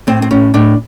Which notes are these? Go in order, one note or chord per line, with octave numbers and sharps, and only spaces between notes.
A2 C4
C4
A2 C#4
A2 D4